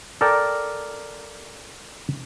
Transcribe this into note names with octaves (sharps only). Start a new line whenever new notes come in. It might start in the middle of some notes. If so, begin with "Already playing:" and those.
A4 A#4 D5 G5